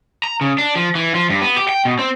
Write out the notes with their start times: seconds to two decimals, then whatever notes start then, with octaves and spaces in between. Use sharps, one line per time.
0.24 A#5
0.41 C#3
0.58 D4
0.76 F3
0.95 E3
1.15 F3
1.30 G2
1.42 B3
1.56 G4
1.69 G5
1.85 B2
1.99 C4